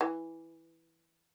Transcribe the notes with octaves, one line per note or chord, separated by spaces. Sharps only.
E3